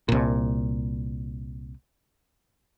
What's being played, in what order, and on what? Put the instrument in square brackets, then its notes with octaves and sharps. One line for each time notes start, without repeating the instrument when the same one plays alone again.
[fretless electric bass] C2 A#2